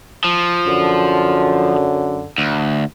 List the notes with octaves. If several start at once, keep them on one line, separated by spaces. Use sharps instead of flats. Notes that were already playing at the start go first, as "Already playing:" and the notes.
F3
F#2 D3
D2